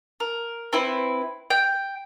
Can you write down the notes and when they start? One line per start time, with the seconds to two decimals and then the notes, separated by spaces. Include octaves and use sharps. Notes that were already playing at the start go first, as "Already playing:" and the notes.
0.20 A#4
0.73 C4 E4 B4
1.50 G5